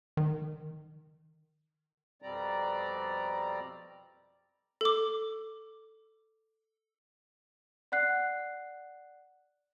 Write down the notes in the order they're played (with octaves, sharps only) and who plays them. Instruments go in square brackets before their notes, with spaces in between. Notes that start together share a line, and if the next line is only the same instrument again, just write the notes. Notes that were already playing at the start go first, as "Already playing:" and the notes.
[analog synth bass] D#3
[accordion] F2 B2 G3 C4 D5 A#5
[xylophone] A4 D6
[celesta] D5 F#5 F#6 C7